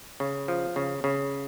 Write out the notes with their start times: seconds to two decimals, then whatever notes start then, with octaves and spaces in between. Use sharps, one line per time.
0.20 C#3
0.48 F3
0.76 C#3
1.04 C#3